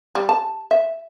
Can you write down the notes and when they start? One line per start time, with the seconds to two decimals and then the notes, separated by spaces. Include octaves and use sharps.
0.15 G3
0.29 A5
0.71 E5